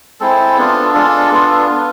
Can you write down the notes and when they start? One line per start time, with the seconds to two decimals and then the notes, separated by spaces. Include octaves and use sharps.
0.20 G#3 C4 E4 A4
0.58 B3 D4 F4
0.94 G#3 D4 F4 A4
1.31 B3 D4 F4
1.67 B3 F4